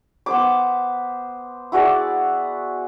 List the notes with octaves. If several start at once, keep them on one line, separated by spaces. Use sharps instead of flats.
B3 C5 D6
E4 F#4 G#4 D5